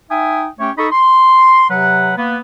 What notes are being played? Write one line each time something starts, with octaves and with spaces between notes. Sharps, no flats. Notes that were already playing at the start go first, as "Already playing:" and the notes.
D#4 E5 G5 G#5 D#6
A3 C#4 G4 C#5
D#4 A4 D#5 B5 C#6
C6
C3 F#3 B4 F#5
A#3 B3